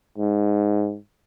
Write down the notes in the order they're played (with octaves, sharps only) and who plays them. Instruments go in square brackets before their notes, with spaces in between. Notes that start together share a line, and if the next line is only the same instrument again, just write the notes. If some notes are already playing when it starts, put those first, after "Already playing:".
[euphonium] G#2